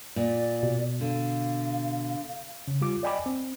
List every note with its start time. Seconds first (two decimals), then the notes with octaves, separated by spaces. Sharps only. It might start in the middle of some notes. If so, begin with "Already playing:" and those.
0.16 A#2 D5
0.63 B2
1.01 D3 F5
2.67 C#3
2.81 G3 F4 D6
3.03 D5 D#5 G5 G#5 B5 D6
3.26 C4